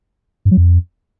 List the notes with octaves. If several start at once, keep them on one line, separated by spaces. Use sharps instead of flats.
G2
F#3
F2